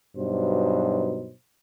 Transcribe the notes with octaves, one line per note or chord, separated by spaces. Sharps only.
G2 B2 F#3 D#4 C5